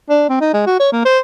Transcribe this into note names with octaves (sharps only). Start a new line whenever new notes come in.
D4
C4
D#4
G#3
F#4
C#5
A#3
C5